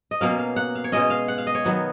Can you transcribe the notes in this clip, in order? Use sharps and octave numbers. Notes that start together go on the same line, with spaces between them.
D#5
B2 F#3 A#3 C#4 F5
F5
F#5
F5
C#5
B2 G#3 C#4 D#5
F5
F#5
F5
D#5
C#5
D#3 F#3 B3